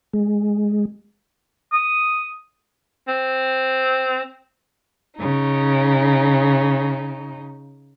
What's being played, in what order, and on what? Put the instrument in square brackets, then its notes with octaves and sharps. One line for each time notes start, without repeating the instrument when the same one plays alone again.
[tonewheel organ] G#3
[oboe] D#6
[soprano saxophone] C4
[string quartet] C#3 D#4